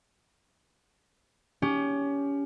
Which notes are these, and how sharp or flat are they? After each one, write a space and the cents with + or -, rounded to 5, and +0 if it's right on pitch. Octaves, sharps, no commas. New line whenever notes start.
C#4 +25 G4 +15